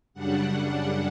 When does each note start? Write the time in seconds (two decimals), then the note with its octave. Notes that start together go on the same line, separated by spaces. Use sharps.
0.14 F#2 C#3 G3 D4 F#5